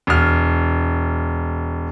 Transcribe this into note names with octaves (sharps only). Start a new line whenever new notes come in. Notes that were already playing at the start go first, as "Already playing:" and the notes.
E1 F6